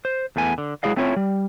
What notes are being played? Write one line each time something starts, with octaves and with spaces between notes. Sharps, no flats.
C5
E2 A3 B3 G#5
D3
F#3 G#3 E4 G#4 D#5 F5
A3 C4 C#4 E4 F4 C#5
G3